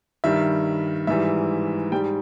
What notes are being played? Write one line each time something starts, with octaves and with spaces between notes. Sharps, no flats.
G2 D#3 G3 E5
G#2 E3 G3 E5
G#2 G3 G5